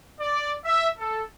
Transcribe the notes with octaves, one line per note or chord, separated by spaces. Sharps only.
D5
E5
A4